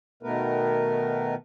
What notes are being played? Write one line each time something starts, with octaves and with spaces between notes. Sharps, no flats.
B2 D#3 A3 B3 A#4 B4